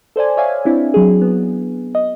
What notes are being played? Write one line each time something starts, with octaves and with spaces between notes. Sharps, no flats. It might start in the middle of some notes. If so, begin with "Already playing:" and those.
A4 C5 D5 G#5
C#5 D5 E5 F5 G#5
C4 D4 E4
F#3 G#4
B3
D#5